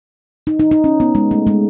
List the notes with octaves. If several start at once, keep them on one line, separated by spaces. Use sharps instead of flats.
D#4
D#4
D#4
C#4
B3
G#3
A3
G#3